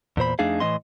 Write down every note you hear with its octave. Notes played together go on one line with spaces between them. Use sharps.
E2 A#2 C5 B5
F2 A3 D4 D#4 G#4 F5
A2 E3 C4 D#5 C6